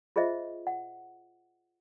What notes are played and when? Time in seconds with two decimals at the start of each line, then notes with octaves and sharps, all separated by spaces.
0.16 F4 G#4 C5 D#5 E5
0.67 F#5